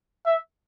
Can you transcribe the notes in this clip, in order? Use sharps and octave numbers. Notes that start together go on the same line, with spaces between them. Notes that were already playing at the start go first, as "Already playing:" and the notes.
E5